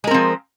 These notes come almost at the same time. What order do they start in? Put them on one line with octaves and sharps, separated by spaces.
G#3 A#4 C4 F3